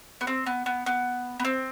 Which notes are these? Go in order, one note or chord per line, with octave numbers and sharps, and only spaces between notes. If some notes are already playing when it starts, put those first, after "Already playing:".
B3
C4
B3
B3
B3
B3
C4